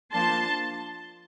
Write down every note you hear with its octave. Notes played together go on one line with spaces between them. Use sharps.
F3 A#3 D4 A5 C6